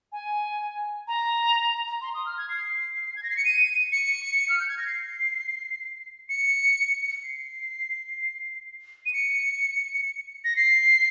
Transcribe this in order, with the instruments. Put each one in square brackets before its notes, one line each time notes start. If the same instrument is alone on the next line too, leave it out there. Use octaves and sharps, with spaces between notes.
[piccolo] G#5
A#5
C6
D#6
F6
G#6
C7
G#6
A#6
C7
C#7
D#7
C#7
F6
G6
G#6
A#6
C7
C#7
C7
D#7
C#7
A#6
C7